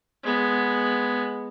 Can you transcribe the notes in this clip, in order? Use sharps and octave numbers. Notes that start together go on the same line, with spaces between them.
G#3 B3